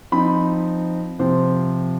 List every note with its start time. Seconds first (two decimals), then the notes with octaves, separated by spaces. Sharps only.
0.12 F3 C4 D#4 B5
1.19 C3 F3 C4 C5